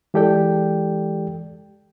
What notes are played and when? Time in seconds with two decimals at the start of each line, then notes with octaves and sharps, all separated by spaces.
0.14 E3 G#3 G4 A4 D5 G5